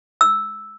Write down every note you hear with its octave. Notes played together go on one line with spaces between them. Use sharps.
E6